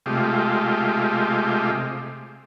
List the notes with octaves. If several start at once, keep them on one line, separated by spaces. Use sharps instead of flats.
C3 G#3 A3 F4 G4